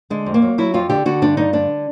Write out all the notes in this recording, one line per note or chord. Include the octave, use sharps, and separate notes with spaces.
D3 G#3
F2
A#3
F#3
F#3 E4
F2 F4
D3 G4
D3 F#4
G2 D4
G2 D#4
D3 D4